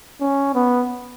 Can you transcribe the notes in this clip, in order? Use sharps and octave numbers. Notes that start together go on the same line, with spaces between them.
C#4
B3